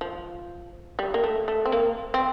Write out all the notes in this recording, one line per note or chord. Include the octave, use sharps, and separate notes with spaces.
F3
G3
A#3
A3
A3
C4
A#3
C4